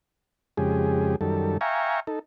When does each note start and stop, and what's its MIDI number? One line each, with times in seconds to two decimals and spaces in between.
0.57 1.16 41
0.57 1.16 49
0.57 1.16 56
0.57 1.16 67
0.57 1.16 68
1.21 1.58 42
1.21 1.58 51
1.21 1.58 55
1.21 1.58 69
1.61 2.00 76
1.61 2.00 77
1.61 2.00 79
1.61 2.00 80
1.61 2.00 82
1.61 2.00 85
2.07 2.19 63
2.07 2.19 69